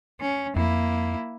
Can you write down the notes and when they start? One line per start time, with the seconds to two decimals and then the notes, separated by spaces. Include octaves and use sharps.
0.21 C#4
0.56 F2 A#3 E4